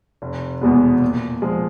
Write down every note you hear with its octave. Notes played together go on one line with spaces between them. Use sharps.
F1
E2 B2 G#3 B3
A#2
F3 G#3